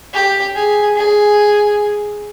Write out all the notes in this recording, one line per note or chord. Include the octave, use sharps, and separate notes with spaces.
G4
G#4
G#4